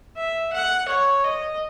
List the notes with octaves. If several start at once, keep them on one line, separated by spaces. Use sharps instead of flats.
E5
F#5
C#5
D#5